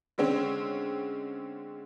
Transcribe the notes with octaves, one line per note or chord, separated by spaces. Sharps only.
D3 G#3 C4 C#4